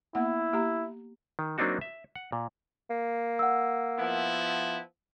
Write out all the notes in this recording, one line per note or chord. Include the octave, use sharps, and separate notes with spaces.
A#3 B3 E4 F#5
A#3 G4 A#5
D#3
F#3 A#3 C4 D4 D#4 F#4
E5
F#5
A#2
A#3
F#5 E6
F3 B3 E4